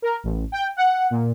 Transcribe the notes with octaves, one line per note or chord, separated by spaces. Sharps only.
A#4
A1
G5
F#5
A#2